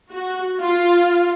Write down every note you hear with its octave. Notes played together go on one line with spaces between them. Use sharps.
F#4
F4